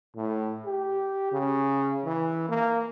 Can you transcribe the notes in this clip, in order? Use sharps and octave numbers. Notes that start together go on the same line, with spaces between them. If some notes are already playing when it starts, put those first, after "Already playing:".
A2
G4
C#3
E3
A#3